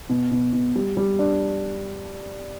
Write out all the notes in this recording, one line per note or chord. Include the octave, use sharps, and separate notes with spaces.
B2
B2
B2
G3
G3
D4